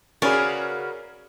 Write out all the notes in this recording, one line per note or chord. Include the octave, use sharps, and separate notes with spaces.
C#3 C#4 F#4 G#4 A#4 B4 D5 F5